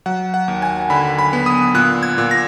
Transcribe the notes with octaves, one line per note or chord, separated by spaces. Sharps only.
F#3 F#5
F#5
D#2
G#5
D3 B5
B5
B3
D#6
A#2 F#6
G#6
A#2
A#6